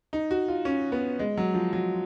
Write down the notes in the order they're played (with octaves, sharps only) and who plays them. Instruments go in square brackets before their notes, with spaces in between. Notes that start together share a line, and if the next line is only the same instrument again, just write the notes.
[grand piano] D#4
F#4
F4
C#4
B3
G#3
F#3
F3
F#3